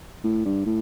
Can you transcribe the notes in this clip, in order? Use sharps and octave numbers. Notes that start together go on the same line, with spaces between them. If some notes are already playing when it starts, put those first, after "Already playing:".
A2
G2
A2